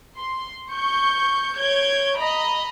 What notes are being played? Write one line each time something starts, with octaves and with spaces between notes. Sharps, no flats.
C6
C#6 G6
C#5 G6 G#6 D7
D#5 A#5 B5